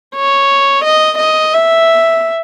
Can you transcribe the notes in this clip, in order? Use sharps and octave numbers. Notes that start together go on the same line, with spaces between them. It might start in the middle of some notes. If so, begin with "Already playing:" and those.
C#5
D#5
D#5
E5